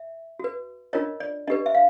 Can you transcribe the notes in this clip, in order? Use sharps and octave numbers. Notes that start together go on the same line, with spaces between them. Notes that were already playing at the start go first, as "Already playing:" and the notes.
Already playing: E5
F#4 B4
D4 F4 A#4 C#5 D#5
D5
D4 G4 B4 D#5
E5
F5